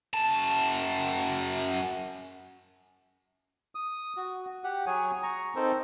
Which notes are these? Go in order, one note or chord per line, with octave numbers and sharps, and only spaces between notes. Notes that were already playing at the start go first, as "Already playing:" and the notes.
F#2 A5
D#6
F#4
G4 F#5
F#3 G#4 C#5 G#5
A#5 C#6
C4 D#4 A4 A#4 C5